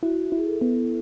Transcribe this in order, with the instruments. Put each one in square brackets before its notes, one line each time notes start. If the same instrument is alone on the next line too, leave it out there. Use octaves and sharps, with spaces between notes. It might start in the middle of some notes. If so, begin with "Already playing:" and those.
[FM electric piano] E4 [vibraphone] F#4
[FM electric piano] E4
[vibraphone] G#4
A4
[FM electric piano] B3